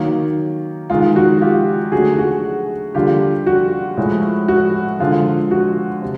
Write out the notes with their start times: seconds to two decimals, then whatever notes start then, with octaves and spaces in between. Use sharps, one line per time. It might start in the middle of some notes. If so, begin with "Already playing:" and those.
Already playing: D#3 F#3 A#3
0.90 D#3 G#3 F4
1.16 F#4
1.41 F4 G4
1.92 D3 F#3 A3 F#4 G#4
2.18 F#4 G#4
2.95 D3 G3 A#3 F4 G4
3.47 F#4
3.97 A2 F3 G#3
4.48 F#4
4.99 D3 F3 G#3 F4
5.51 F#4
6.02 C3